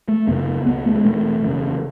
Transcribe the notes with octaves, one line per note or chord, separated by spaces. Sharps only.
A3
F#1 F#2 C#3 B3
C#2 B2 B3
A3
G#3
E1 E2 B2 A3
F#1 E2 C#3